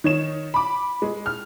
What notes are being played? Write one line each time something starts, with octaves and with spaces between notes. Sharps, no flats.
D#3 C#5 E7
B5 D6
G#3
F6